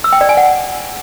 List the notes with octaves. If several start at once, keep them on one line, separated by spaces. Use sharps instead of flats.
E6
G5
D5
G#5
F#5